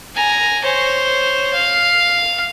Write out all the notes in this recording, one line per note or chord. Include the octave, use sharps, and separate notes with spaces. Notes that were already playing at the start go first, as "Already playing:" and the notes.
G#5 A#5
C5 C#5
F5